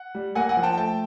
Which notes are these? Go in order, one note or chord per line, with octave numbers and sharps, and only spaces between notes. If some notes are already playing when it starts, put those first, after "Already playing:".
Already playing: F#5
G3
A#3 F#5 G#5
F#5 G#5
F3
G5 A5
A3 G5 A5